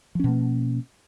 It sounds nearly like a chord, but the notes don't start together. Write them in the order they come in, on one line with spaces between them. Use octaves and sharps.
F3 C#4 B2 A#3